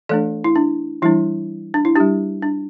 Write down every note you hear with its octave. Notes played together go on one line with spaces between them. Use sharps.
E3 A3 D4 A4 D5
E4
D4
E3 G3 D4 E4
D4
E4
G3 D4 G4
D4